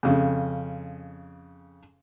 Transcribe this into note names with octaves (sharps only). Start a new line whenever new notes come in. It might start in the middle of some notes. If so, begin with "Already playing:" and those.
F2 C#3